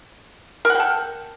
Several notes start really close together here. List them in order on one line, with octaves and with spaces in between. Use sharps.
A#4 F#5 G5 A4